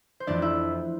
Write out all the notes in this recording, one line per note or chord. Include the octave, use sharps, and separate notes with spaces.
C5
F2 E3 A3 D4 D5
E4 E5